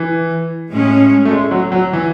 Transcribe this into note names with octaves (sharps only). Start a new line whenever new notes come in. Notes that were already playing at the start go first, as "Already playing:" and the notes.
Already playing: E3
A2 G#3 C#4
A3
G#3
F#3
F#3
E3